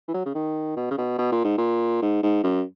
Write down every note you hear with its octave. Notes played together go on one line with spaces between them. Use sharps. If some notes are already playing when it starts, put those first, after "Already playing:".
E3
F#3
C#3
D#3
B2
C#3
B2
B2
A#2
G#2
A#2
G#2
G#2
F#2